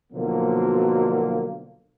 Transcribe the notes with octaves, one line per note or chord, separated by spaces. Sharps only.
B1 B2 D3 F3 F#3 A#3